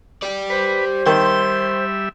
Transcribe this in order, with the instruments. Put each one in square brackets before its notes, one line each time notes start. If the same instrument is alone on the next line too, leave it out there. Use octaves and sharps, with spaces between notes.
[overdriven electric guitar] G4 D5
[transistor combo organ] B4 [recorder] C5
[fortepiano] D#3 [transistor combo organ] G3 E5 [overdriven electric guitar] C6